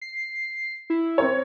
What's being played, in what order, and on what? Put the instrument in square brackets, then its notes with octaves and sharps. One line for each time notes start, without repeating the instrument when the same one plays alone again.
[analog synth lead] C7
E4
[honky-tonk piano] C4 A#4 C#5